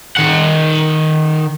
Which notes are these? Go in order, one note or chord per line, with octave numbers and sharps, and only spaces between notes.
D#3 F#5